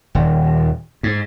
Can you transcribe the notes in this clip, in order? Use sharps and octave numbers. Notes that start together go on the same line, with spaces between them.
D#1
G#2